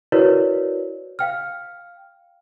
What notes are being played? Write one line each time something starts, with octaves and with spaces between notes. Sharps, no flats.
E4 F#4 A#4 B4 C#5 D5
F5 G5 F6